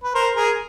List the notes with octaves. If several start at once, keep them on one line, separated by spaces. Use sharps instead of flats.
B4
A#4 C5
G#4 A#4